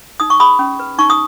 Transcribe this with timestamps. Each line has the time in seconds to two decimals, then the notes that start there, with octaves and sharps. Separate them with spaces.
0.20 D#4 D#6
0.30 C#6
0.40 G#4 B5 D#6
0.59 C#4
0.80 B4
0.98 D#4 C#6
1.10 D#6